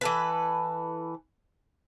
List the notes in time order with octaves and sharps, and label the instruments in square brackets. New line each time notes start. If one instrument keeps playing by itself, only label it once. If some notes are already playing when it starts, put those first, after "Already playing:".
[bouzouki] E3 A4 B4